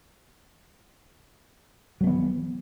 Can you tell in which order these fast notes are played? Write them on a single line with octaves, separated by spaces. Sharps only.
F#3 A3 B3 E3